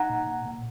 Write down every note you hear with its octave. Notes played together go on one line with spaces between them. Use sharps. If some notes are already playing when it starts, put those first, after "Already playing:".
Already playing: D#4 F#5 A#5
A#2
A#2
A#2